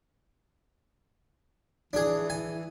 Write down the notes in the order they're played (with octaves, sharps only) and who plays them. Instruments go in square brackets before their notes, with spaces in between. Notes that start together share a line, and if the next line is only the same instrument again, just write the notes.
[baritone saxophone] E3 [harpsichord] D4 G#4
[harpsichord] G#5